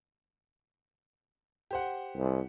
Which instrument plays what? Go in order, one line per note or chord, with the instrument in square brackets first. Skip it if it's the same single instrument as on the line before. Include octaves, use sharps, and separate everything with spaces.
[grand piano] G4 C5 F#5
[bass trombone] C2